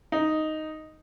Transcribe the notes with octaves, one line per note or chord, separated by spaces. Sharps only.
D#4